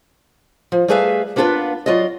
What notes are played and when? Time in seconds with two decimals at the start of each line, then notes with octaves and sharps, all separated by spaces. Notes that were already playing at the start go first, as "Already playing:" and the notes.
0.72 F3
0.88 G3 A3 G#4 B4 E5 F5
1.36 A#3 B3 D4 F4 G#4 B4
1.86 F#3 F4 D5 D#5